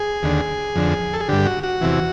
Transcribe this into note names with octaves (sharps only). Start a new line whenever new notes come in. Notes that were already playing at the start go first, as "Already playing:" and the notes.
Already playing: G#4
D#2 D3
F2 D3
A4
G#4
G2 D3 G4
F#4
F#4
E2 C3 E3